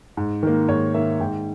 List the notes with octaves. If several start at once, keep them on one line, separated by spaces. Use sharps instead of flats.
G#2
D#3 A#3
G#2 C#5
D#3 A#3 E5
G#2 G5